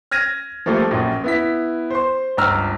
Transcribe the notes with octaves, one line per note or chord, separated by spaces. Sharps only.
F6 G#6 A#6 D#7
F3 G3 A3 A#3 A4
A#1 F#2 A#2
B3 E4 B6
C5 C6
G1 C#2 A#5 E6 F6